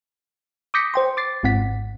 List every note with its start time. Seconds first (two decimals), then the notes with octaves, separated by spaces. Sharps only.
0.74 D6 D#6 G6 A#6 B6 C#7
0.94 C5 G5 C6
1.17 D6 A6 C7
1.43 G#1 G#2 C4 F#5 B6